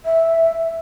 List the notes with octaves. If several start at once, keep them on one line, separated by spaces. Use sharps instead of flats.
E5